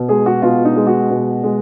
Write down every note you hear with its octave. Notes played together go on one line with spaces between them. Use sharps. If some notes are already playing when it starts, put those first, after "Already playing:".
Already playing: B2
G#3 G#4
F#4
B2 F4
D#4
G#3
F#4
B2
G#3